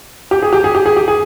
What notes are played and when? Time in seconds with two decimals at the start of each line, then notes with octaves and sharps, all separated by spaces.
0.31 G4
0.42 G#4
0.53 G4
0.64 G#4
0.75 G4
0.86 G#4
0.96 G4
1.08 G#4